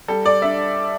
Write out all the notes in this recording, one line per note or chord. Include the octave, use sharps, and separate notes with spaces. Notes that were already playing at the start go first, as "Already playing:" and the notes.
G3 A4
D5
D4 E5